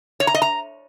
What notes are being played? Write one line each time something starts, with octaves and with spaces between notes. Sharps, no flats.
C#5
A#5
D#5
A#5